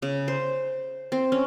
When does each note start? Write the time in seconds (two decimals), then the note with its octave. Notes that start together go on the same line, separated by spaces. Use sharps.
0.02 C#3
0.28 C5
1.12 C4
1.32 C#4